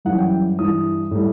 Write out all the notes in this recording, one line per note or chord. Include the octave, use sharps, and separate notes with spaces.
F#2 E3 G3 F#5
G5
G2 E3 G3 D#6
A2 G3